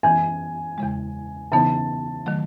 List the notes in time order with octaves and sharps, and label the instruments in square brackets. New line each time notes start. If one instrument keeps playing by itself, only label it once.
[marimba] F#2 E3 B3 [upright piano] G#5
[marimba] E2 C#3 G#3
[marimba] C#3 E3 B3 D#4 [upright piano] A5
[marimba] D#3 F#3 A3